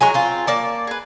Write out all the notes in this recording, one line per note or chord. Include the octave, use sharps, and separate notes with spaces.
F#3 G#3 G#5 A#5 C#6
C4 F4
A#3 D5 A5
G#4 B4